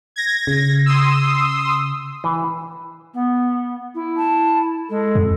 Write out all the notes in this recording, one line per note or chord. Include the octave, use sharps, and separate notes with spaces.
G#6 A#6
C#3
C6 D#6 E6
E3
B3
E4
A5
G#3 A4
F2